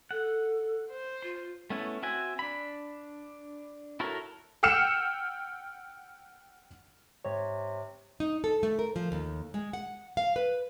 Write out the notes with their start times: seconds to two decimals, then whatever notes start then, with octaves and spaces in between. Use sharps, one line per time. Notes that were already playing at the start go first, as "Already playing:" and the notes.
0.11 A4 F#5
0.90 C5
1.22 F4 C6
1.70 A3 B3 C#4 E4
2.03 C4 F#4 E5 G#5
2.39 D4 B5
4.00 E4 F#4 A4 A#4 C#5
4.63 F#5 G5 E6 F6 C#7 E7
7.25 G#2 C3 C#5
8.20 D#4
8.44 A4
8.63 A3
8.79 A#4
8.96 F3
9.12 D#2
9.54 G#3
9.73 F#5
10.17 F5
10.36 B4